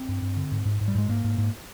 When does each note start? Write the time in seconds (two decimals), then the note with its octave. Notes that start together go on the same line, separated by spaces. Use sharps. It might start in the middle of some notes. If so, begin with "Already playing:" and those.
Already playing: C4
0.08 G2
0.22 G2
0.37 D3
0.52 G#2
0.65 G#2
0.81 G#2
0.88 G3
0.95 G#2 G#3
1.09 G#2 A#3
1.24 G#2
1.38 G#2